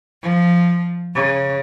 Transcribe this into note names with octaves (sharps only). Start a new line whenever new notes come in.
F3
C#3